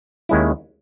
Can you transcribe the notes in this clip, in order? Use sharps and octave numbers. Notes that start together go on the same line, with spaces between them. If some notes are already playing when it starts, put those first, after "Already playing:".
D#2 D#3 G#3 C#4 E4